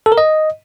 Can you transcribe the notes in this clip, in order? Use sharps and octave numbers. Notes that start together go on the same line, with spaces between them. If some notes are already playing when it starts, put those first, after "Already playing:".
A4
A#4
D#5